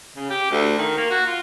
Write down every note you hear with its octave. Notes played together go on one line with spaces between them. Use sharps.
C#3
G4
D2
D#3
A#3
F#4
F4